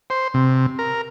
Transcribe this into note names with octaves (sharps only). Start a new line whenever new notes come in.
C5
C3
A#4